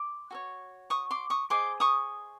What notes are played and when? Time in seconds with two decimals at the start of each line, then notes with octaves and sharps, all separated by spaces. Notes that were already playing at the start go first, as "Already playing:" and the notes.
Already playing: C6 D6
0.31 F#4 A4 C#5
0.90 C#6 D#6
1.11 C6 D6
1.30 C#6 D#6
1.50 G#4 C5 D#5 C6 D6
1.80 C#6 D#6